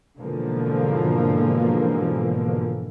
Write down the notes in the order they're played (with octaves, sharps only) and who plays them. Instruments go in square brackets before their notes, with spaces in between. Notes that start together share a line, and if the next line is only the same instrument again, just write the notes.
[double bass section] G#2 B2 D3 E3 F3 A#3